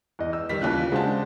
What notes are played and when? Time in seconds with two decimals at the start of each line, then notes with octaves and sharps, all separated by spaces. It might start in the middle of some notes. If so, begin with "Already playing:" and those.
0.19 E2 D#5
0.33 E6
0.49 D#3 G3 B6
0.61 D#2 C#3 E3 F4 F#6
0.92 C#3 G#3 D4 F#4 C5 A5